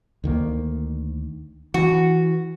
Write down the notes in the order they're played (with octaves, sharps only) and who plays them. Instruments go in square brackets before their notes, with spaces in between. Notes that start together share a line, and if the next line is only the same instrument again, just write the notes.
[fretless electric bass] D2 D#3 A#3
[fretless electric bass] E3 [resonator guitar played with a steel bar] F#4